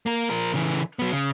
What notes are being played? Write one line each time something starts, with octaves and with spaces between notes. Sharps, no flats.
A#3 A#4
F3 A#4
C#3 E3
F#3 B3
C#3